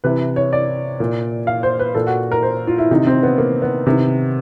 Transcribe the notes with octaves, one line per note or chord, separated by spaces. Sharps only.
C3 E3 B4
C#5
D5
A#2
F5
C5
B4
A#2 A4
F#4
A#4
C5
F4
E4
C3 D#3 D#4
C4
B3
A#3
B3
C3 D#3